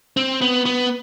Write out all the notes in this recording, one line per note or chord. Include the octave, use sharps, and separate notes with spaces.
C4
B3
B3